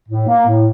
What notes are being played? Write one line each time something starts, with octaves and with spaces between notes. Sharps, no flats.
A2
A#3
A2